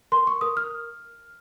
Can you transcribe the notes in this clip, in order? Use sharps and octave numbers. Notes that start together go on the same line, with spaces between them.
A#4 C6
C#6
A#4 D#6
F6